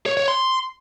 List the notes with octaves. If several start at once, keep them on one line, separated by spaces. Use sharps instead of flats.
C#5
C#5
C6